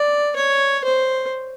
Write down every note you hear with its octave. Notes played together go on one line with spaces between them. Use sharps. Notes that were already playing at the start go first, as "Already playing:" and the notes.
Already playing: D5
C#5
C5